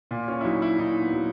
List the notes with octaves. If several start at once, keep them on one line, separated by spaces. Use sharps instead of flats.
A#2
C#4
E4
F#3 D#4
E4
A#2 D#4
B3
F#3